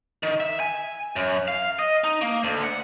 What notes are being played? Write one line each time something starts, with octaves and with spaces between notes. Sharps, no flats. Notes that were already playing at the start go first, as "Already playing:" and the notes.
D#3
E5
G#5
F#2
F5
D#5
D#4
A#3
D2
F#5